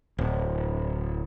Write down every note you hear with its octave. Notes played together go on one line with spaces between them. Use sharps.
D1